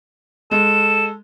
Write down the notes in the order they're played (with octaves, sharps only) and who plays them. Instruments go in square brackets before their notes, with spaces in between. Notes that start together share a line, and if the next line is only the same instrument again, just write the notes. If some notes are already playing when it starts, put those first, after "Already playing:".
[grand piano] G#3 [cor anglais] A4 [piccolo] E7